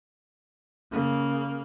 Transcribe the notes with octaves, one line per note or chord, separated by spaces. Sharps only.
C#3 A#3